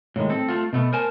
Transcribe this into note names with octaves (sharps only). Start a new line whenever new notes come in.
A2 D#3 G#3
C4 A4
A3 F4
B2 A3 B3
A#4 C5 G#5 A5